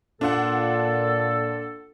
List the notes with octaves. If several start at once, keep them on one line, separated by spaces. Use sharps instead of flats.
A#2 D4 F4 A4 F#5